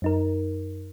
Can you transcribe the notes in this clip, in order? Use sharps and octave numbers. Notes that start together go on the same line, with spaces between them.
F#2 D#4 A#4